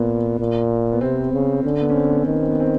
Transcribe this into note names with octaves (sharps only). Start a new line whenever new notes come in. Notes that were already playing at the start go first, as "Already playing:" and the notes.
Already playing: A#2 A#3 B3
A#2
B3
C3 C4
C#3
D3 C#4
B3
C#4
C4
B3
C4
D#3 B3
C4
B3
C4